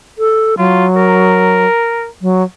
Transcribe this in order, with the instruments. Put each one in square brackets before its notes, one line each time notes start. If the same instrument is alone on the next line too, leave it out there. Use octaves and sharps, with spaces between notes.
[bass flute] A4
[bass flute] F#3 [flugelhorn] F4
[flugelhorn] A#4
[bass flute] F#3